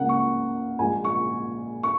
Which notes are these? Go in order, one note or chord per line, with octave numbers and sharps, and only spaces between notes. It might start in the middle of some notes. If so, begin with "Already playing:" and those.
Already playing: C#2 C#3 A#3 A#4 F#5
C#6
A#1 A#2 G#3 G#5
C#6
C#6